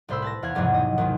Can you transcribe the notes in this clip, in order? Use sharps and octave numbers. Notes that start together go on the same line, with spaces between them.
C2 A2 C5 B5 E6
B4 A5 A#6
E2 F5 F#6 G#6
B1 E2 G#2 C3 F3 F#3
D#5
D#2 D#3 F3